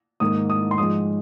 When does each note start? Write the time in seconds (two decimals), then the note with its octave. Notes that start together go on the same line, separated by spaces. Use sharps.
0.20 G#2 D#3 A#3 D#6
0.50 D#6
0.71 C6
0.78 G#2 F3 G#3 D#6